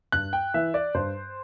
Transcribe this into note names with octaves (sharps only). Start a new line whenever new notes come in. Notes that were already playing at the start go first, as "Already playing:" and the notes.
G2 F#6
G5
E3 E5
D5
G2 C5